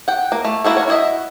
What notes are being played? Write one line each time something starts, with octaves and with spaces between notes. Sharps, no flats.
F#5 G5
A#3
A3
A#3 E4 F#4 A4
A#4 C#5
E4 F#4 C#5 D#5 E5